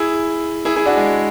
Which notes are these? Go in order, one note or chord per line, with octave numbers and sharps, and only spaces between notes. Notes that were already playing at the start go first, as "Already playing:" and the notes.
Already playing: E4 G#4
E4 G#4
E4 G#4
D4 F#4
G#3